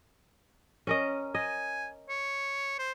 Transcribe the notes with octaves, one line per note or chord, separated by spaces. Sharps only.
C#4 A#4 D#5
D#5 G#5
C#5
C5